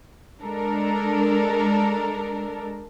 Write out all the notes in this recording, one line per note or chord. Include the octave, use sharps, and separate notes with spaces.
G#3 D4 A4 A#4